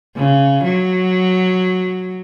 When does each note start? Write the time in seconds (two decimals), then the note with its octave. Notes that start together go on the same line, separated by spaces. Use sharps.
0.17 C#3
0.65 F#3